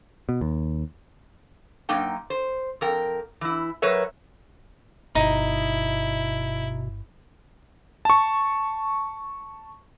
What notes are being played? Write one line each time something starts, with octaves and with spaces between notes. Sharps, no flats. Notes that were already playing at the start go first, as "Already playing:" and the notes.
B2
D#2
F#2 A#3 D#4 G5
C5
F2 A#4 G5
E3 E4
F#3 A#4 B4 C#5 E5
G1 B2 D#4 E4
A5 C#6